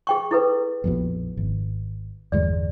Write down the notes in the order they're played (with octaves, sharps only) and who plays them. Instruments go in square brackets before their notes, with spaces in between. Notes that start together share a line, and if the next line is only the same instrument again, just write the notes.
[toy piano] G#4 G5 C#6
E4 A4 B4
[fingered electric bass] A#1 F2 B2
G#1
[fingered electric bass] G1 E2 G#3 [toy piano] D5